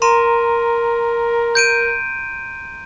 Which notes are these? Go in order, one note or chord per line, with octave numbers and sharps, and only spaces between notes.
A#4 A#5 C6 D#7
G6 D7 D#7